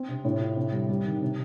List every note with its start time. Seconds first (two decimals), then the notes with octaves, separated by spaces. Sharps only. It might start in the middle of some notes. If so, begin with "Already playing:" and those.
Already playing: C4
0.09 C3
0.25 A2
0.41 F4
0.56 C3
0.73 G3
0.89 G3
1.05 D#3
1.21 C3